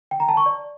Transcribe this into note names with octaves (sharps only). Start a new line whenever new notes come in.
G5
A#5
A5
C#6
D5